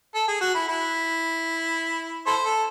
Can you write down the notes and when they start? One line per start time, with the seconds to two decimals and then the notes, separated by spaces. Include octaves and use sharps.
0.15 A4
0.28 G#4
0.41 F#4
0.55 E4
0.68 E4
2.27 E4 A4 C5
2.44 A4